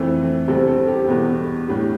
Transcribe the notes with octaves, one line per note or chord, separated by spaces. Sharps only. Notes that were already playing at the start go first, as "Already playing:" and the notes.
Already playing: F2 E3 A3 C4 A4
E2 C3 G3 C4 A4
A4
G4
E2 B2 B3
A2 G3 B3